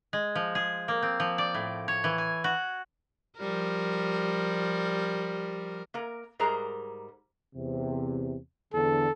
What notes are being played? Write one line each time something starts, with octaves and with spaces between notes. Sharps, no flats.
G#3
F3
G#4
A#3
C4
F3
D5
A2
C#5
E3
G#5
F#4
F3 G3 A#4
A#3 A#4
G#2 G3 G#4 A#4 C5 A#5
E2 C3
E2 D3 A4